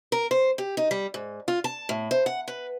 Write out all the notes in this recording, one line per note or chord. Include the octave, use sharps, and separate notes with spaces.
A#4
C5
G4
D#4
G3
G#2
F4
A5
A2
C5
F#5
B4